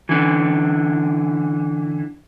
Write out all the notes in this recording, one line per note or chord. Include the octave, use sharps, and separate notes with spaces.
D3 E3